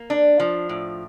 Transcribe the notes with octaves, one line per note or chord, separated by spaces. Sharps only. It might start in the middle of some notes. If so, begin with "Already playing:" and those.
Already playing: A#3
D4
F3
A2